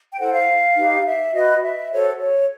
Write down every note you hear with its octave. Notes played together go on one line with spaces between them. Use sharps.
G5
E4 A4 C5 F#5
F5
D#4 G4 B4
E5
F#4 B4 D#5
E5
F#4 A4 C5 C#5
C#5